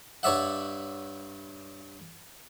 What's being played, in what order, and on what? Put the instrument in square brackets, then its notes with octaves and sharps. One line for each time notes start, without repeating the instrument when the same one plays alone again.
[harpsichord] G2 C#5 D5 E5 F#5